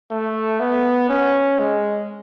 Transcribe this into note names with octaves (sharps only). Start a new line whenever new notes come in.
A3
B3
C#4
G#3